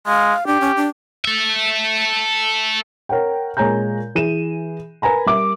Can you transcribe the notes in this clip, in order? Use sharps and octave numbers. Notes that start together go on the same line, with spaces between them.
G#3 F5
D4 G4
C#4
D4
A4 E5
A#4 C#5 F#5 G5
A#2 G#3 C#5 G#5 A#5 G6
E3 G#4 D#7 E7
A#4 B4 G#5 A#5 B5
G3 A#4 E5 D6